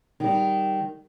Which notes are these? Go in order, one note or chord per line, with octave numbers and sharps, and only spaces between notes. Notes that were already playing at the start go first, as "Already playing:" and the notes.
D#3 G3